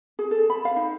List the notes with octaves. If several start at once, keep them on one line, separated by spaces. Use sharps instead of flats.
G#4
A4
B5
F5
D#4